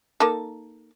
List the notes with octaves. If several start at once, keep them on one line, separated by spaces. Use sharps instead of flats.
A#3 D#4 A4